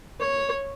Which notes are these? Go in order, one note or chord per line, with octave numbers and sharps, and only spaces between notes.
C#5